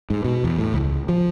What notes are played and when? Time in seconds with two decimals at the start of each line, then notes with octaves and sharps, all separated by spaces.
0.10 G#2
0.25 B2
0.44 E2
0.58 A2
0.74 C#2
1.09 F3